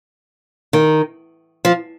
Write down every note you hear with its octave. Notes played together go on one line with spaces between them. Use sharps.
D#3
F3